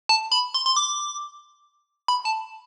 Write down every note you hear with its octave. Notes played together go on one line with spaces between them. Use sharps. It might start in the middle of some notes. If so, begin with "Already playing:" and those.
A5
B5
C6
C6
D6
B5
A5